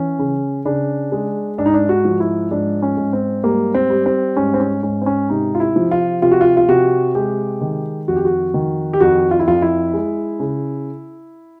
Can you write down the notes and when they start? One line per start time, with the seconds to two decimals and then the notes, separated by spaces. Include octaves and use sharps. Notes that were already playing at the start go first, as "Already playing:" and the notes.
Already playing: E3 C#4
0.19 C#3
0.65 C#3 D4
1.12 G#3
1.58 G#2 D4
1.66 D#4
1.74 D4
1.89 F#4
2.05 F3
2.20 E4
2.51 G#2 D4
2.82 C#4
2.97 G#2
3.13 C4
3.44 G3 A#3
3.74 C4
3.90 G3
4.06 C4
4.37 G#2 C#4
4.54 C4
4.60 C#4
4.83 G#2 C#4
5.02 C4
5.06 C#4
5.29 C3 D#4
5.55 F4
5.60 E4
5.76 F3
5.91 F4
6.22 C3 F4
6.31 F#4
6.41 F4
6.57 F4
6.68 C3 F#4
7.15 G#3 G4
7.61 D#3
8.08 F2 F#4
8.16 G4
8.25 F#4
8.54 D#3
8.93 G4
9.00 F2 F#4
9.31 F4
9.39 E4
9.47 F2 F4
9.62 E4
9.94 G#3
10.40 C#3